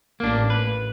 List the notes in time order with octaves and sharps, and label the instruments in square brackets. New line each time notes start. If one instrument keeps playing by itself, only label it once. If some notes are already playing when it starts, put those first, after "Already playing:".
[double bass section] A1 [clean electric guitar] A#3 D4
[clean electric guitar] B4